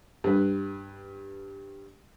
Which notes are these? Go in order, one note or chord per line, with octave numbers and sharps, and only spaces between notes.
G2 B4